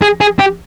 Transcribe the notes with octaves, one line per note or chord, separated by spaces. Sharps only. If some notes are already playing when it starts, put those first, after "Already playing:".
G#4
G#4
G4